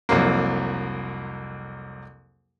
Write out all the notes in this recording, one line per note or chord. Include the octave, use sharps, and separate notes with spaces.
C2 F2 F#3 A#3